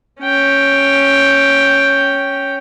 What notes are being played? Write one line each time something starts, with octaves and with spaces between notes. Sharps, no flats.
C#4 G5